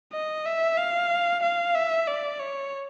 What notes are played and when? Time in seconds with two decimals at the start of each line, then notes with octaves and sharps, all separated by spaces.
0.13 D#5
0.45 E5
0.77 F5
1.43 F5
1.75 E5
2.07 D5
2.40 C#5